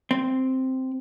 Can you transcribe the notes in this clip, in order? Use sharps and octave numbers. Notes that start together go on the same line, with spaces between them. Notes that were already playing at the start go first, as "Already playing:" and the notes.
C4